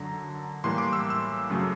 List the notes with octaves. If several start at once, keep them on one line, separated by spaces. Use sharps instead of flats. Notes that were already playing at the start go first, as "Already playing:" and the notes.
Already playing: F#2 D3 F#3 A#5
A2 E3 G3 A#3 C6
D6
E6
E6
F#2 C#3 F#3 A3